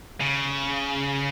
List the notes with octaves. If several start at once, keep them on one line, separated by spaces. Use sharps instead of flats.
C#3